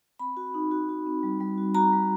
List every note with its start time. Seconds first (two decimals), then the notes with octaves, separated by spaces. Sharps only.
0.19 C4 B5
0.37 F#4
0.54 D#4
0.71 F#4
0.89 F#4
1.06 C4
1.23 G3
1.40 G3
1.58 F#4
1.75 F#4 A#5
1.92 G3